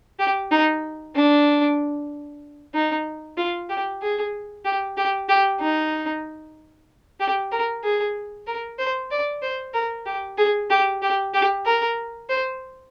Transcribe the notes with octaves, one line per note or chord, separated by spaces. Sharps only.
G4
D#4
D4
D#4
F4
G4
G#4
G4
G4
G4
D#4
G4
A#4
G#4
A#4
C5
D5
C5
A#4
G4
G#4
G4
G4
G4
A#4
C5